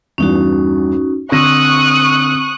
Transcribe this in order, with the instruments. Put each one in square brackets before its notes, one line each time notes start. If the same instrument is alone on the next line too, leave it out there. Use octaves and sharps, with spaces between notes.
[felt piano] E2 G2 [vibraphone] C#4 D#4 F#4
[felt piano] D3 A#6 [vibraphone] C4 E6 [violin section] C#6 D#6 F#6